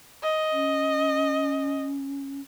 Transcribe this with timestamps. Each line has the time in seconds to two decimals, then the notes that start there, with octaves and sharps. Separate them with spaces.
0.23 D#5
0.53 C#4